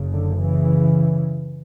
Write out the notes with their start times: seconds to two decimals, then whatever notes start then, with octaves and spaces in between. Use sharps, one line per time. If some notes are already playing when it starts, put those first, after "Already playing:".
Already playing: F#1 F#2 C#3
0.12 D3
0.40 C#3 E3